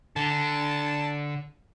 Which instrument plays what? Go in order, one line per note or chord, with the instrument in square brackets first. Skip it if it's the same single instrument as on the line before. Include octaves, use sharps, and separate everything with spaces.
[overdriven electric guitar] D3 [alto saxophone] A5